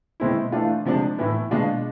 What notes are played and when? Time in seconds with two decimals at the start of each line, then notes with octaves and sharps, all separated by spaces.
0.20 B2 G#3 C4 E4
0.52 E3 A3 D4 F4
0.85 C3 F3 G#3 D4
1.18 A2 E3 B3 E4
1.51 B2 G#3 D4 F4